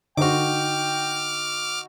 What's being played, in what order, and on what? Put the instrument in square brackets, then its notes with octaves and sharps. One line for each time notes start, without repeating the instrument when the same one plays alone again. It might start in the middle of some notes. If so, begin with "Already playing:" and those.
[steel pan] D3 C5 [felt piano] D#4 F#4 [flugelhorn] G5 [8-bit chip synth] D6 F6